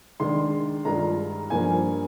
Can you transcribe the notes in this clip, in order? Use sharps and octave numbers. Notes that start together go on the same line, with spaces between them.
D#3 G#3 D4 C6
G2 D#3 G#3 D4 F4 A#5
G2 F3 A#3 G#5